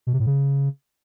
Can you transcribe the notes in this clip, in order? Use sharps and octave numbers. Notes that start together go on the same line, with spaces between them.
B2
C3
A2
C#3